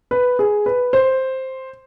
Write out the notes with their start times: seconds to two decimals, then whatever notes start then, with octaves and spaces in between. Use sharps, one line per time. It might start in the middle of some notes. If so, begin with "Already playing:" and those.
0.11 B4
0.39 G#4
0.66 B4
0.93 C5